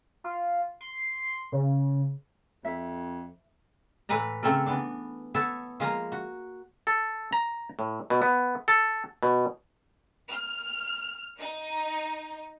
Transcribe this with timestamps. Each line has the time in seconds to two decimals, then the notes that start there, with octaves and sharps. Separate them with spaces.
0.24 F4
0.81 C6
1.52 C#3
2.65 F2 E5
4.09 A2 E3 B4 F#5 A#5
4.43 C#3 A3 C4 A4 A#4
4.66 E3 B3 D4
5.34 B3 A4 C#5 E5 A5
5.80 F3 G#3 A#3 F5 A#5
6.12 F#4
6.87 A4
7.33 A#5
7.79 A2
8.10 B2
8.22 B3
8.68 A4
9.23 B2
10.29 F6
11.39 D#4